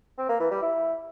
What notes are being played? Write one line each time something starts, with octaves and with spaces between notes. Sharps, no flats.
C4
A#3
E3
G3
E4